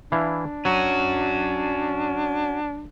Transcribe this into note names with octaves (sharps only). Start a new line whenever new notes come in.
E3 D4 E4 F5
F#3 C#4 F#4